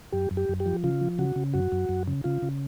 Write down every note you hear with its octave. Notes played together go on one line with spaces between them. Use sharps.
F#2 G4
F#2
G4
F#2
G4
F3
C#3 F4
F3
C#3 F#4
C#3
F#2 F#4
F#2
F#2
C#3
C#3 F4
C#3